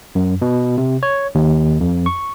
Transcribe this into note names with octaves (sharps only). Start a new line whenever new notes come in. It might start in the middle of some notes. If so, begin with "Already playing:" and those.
F#2
B2
C3
C#5
D#2
F2
C#6